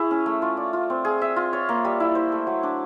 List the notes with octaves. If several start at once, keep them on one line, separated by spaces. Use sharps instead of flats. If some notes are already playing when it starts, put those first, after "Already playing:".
Already playing: E4 G#4 C#5
C#4
A3
F4
D5
F4
C4
G#4
E5
F4
C#5
A#3
G3
E4
C5
A3
F#3
D4